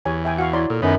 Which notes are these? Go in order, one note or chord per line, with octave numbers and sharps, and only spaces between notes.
E2 G4 C#5 G#5
E5 G5 G#5
F#4 F5 F#5 C#6
E4 C#5 D5 C6
A#2 A4
F#2 D#3 B3 C#5